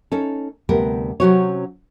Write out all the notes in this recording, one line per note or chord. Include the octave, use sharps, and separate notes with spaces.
C#4 D#4 A4
D2 C3 G3 B3 A#4
C3 F#3 C#4 F#4 C5 C#5